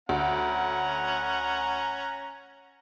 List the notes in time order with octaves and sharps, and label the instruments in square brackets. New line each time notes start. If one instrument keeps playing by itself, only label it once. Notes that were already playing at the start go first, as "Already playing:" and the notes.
[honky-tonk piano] D2 [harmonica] C#4 F#5 A#5